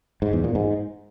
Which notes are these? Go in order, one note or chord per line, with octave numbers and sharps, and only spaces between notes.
G#2
E2
A#2
G#2